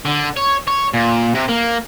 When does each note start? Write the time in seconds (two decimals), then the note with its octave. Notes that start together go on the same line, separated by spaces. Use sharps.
0.05 D3
0.37 C#5
0.68 C#5
0.94 A#2
1.35 C3
1.48 A#3